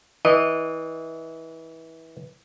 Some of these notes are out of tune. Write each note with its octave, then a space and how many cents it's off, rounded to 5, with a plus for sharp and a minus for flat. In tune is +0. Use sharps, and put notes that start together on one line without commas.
E3 -25 D#5 -15